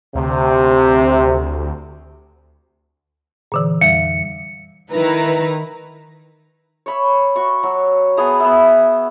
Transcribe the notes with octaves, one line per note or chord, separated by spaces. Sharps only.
D2 C3
A#2 D3 E3
F2 G3 E5 C#7
D#3 E4 B4 A#5
C#5 B5 E6
F#4 C#6
F#3 E6
B3 G#4 A5 A#5
B3 E5